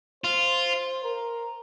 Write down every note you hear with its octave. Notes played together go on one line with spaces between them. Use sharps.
F4 C5
A#4